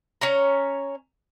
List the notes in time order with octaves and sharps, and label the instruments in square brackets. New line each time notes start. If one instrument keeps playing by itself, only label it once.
[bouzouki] C#4 C#5 A#5